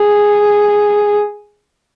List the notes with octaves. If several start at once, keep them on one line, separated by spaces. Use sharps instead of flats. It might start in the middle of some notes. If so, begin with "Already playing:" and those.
Already playing: G#4